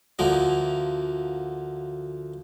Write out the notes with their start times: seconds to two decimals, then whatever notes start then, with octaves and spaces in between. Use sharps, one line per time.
0.19 D2 D3 F3 A#3